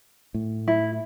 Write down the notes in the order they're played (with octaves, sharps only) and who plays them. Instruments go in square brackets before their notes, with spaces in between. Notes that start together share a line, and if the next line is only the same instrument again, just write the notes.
[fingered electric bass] A2
[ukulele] E4